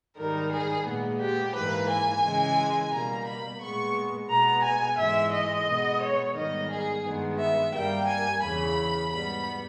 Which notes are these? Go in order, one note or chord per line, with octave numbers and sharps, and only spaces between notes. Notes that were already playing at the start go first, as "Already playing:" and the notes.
G#2 D#3 G3 A#4
G#4
A#2 G#3 B3
G4
G#2 E3 A#3 B4
G#5
C#3 E3 G#3
B2 G3 A#3 A#5
B5
A#2 G#3 B3 C#6
B2 G#3 B3 A#5
G#5
G#2 E3 G#3 E5
D#5
B2 G#3 B3
C#5
G#2 D#3 G3 B3 D#5
G#4
G2 D#3 G#3 B3
E5
G2 G3 A#3 G5
G#5
E2 C#3 E3 B5
G#2 G3 B3 B5